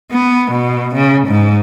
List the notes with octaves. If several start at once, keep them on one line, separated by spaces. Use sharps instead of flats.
B3
B2
C#3
G#2